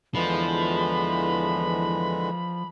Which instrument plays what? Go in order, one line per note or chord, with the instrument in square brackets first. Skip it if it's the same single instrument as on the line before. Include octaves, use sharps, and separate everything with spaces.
[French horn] E2 [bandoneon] D3 E3 G#3 [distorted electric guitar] F3 [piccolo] B5